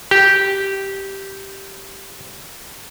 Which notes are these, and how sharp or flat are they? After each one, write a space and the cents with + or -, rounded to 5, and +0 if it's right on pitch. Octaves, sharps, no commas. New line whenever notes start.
G4 -10